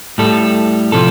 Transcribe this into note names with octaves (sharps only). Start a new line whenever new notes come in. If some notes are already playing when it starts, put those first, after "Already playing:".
A2 G3 A4
C3 F3 A4